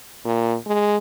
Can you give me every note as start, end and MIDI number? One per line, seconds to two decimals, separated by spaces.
0.25 0.56 46
0.67 0.97 56